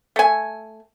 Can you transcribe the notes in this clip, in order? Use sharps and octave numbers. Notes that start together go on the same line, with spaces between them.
A3 G#5